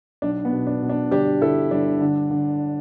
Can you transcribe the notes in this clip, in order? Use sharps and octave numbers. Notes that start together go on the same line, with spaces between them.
B1 D4
B3
B2
D4
B2
D4
G1 D4 G4
G1 E4 A4
G1 D4
D3
D3